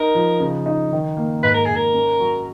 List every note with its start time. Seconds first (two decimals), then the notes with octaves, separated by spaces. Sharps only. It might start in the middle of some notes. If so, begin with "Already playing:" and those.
Already playing: D#4 A#4
0.15 F3
0.40 C#3
0.66 D#4
0.92 D#3
1.17 A#3
1.43 G#2 B4
1.54 A#4
1.65 G#2 G#4
1.76 A#4
1.94 C#4
2.20 F#3